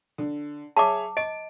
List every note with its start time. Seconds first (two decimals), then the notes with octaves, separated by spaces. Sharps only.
0.18 D3
0.77 G#4 C#5 E5 A5 D6
1.17 D#5 D7